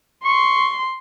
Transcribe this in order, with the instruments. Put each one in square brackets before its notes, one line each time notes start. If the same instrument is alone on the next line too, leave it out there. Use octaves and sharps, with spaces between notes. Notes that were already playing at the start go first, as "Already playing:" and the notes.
[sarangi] C6 [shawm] C#6